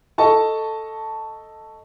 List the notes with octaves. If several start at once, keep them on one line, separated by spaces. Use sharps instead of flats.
A4 D#5 A5 C#6